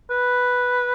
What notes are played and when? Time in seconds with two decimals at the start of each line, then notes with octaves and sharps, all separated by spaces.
0.10 B4